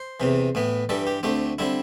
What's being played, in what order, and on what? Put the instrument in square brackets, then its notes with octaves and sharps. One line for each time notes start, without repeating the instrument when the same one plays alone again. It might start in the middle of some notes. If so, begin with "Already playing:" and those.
Already playing: [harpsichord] C5
E2 C3 E3
A2 E3 B3
G2 E3 G3 A4
G4
D2 D3 A3 C4 G4
D3 G3 C4 E4